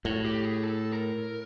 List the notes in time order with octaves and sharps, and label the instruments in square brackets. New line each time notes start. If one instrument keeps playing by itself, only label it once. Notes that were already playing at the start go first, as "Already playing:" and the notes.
[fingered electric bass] A2 [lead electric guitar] F#4
[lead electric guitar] G4
G#4
A4
A#4